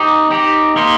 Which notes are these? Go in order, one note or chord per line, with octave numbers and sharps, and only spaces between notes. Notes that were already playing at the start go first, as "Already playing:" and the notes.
Already playing: C4 D#4 G4
C4 D#4 G4
A#3 D#4 G4 C5